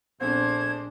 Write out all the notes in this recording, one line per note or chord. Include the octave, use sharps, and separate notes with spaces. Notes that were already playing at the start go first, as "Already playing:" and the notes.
A#1 G#3 A3 B3 C4 D4 C5 G#6